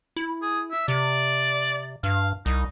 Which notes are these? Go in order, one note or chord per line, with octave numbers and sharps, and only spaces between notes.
E4
G#4
E5
C3 D5
G2 F5
C2 D#4